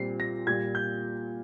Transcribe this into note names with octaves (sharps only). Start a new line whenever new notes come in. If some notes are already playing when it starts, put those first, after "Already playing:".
Already playing: A#2 G3 C4 C7
A#6
A#2 G3 A#3 G#6
G6